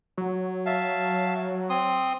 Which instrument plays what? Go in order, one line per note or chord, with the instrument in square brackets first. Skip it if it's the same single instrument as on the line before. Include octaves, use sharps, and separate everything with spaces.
[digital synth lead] F#3
[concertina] E5 F5 A5
C4 C6 D#6